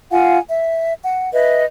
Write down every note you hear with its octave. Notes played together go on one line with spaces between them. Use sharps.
F4 F5 F#5 G#5
E5
F#5
B4 D#5 E5